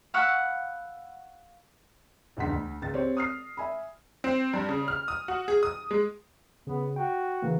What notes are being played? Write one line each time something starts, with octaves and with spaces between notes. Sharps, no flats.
F5 F#5 B5 C#6 E6 F#6
E1 C#2 G2 F#5 C6 B6
D2
C#2 A6
C4 G4 C#5
D#6 F6 C7
E5 G#5 B5
C4
G2
C#3
F6
D#6
F#4
G#4
D#6
G#3
C#3 B3
F#4 G5
C#3 E3 A#3